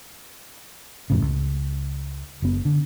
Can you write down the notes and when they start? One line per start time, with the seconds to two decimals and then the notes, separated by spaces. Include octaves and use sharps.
1.10 F2 A2 C#3
1.22 C#2
2.42 F#1 B3
2.65 D3